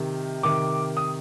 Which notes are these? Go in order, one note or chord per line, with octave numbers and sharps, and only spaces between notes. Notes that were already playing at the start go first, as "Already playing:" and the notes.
Already playing: C3 D#3
C3 D#3 D6
D#6